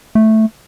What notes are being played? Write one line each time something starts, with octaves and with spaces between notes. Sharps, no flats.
A3